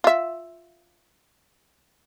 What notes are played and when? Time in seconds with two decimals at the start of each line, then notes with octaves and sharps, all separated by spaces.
0.04 F4 E5